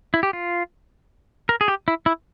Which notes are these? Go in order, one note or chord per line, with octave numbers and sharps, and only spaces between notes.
E4
G4
F4
A#4
G#4
G4
E4
E4